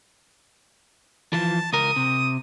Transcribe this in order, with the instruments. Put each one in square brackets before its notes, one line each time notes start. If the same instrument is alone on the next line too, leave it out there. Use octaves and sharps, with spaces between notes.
[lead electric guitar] E3 F3 [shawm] A5
[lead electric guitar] C#2 A#4 [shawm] D#6
[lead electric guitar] C3